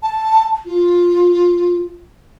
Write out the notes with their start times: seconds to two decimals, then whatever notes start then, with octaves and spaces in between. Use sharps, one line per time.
0.03 A5
0.66 F4